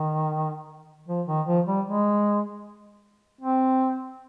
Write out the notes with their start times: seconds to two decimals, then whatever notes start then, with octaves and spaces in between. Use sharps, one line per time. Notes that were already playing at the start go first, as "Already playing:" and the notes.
Already playing: D#3
1.08 F3
1.27 D#3
1.47 F3
1.67 G3
1.86 G#3
3.41 C4